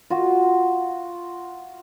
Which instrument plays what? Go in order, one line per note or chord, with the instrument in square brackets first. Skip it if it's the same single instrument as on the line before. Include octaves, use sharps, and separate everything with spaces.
[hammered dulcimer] F4 F#4